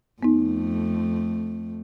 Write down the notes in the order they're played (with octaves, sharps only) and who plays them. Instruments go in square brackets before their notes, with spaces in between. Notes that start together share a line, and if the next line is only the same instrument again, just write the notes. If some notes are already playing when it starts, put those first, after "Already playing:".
[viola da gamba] F2 A3 [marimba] B3 D#4